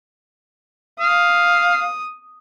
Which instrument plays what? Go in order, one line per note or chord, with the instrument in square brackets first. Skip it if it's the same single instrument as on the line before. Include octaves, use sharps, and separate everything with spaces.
[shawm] F5 [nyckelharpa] D#6